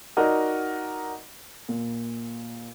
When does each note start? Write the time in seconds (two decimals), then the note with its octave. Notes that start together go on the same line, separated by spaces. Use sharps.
0.17 D#4 F#4 A#4 D5 D#5 F#5
1.69 A#2